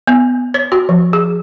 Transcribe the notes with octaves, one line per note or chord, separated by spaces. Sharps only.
B3
C#5
F#4
F3
G#4